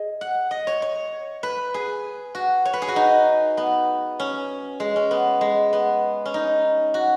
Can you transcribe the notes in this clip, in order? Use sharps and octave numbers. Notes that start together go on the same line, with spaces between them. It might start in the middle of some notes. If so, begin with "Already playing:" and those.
Already playing: G#4 D#5
F#5
D#5
C#5
C#5
B4
G#4
F#4
C#5
B4
G#4
F#4
D#4
B3
C#4
G#3
C#4
B3
G#3
B3
C#4
D#4
F#4